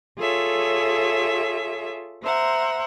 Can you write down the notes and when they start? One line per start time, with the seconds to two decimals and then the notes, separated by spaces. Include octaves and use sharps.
0.18 F4 G#4 A4 C#5 E5
2.23 C5 E5 F#5 A#5